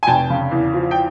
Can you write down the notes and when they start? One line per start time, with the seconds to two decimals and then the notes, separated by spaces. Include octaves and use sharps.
0.03 G#5
0.07 F1 G5 A5
0.30 C#3
0.51 E2
0.74 F3
0.91 G5